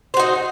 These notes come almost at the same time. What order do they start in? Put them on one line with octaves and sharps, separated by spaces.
C5 F#4 D#4